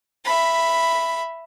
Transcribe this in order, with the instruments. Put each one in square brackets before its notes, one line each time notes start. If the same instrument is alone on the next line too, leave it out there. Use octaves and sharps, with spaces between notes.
[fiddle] E5 B5